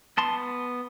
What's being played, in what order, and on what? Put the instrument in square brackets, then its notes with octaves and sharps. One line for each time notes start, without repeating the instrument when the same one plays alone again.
[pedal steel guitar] B3 A5 C6